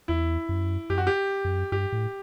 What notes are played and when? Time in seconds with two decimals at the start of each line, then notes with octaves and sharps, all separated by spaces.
0.08 E2 E4
0.49 F#2
0.90 F#2 G4
0.98 F#4
1.07 G4
1.44 F#2
1.72 G2 G4
1.92 A2